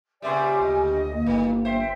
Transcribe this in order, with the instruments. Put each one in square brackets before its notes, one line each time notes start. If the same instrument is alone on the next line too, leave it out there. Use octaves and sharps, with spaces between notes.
[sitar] A#2 C#3 G3 [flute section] C5 D5 E5 [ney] G#5
[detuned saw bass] D2 [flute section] D#5
[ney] A#3
[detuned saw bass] G1 [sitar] D#3
[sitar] C5 [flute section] E5 G5